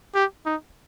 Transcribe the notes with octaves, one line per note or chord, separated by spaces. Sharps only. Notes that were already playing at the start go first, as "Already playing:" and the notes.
G4
D#4